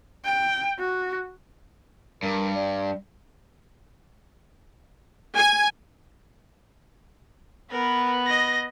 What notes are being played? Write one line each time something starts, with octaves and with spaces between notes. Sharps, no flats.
G5
F#4
G2 A#4
G3
G#5
B3 A#4 B4
D#5 A#6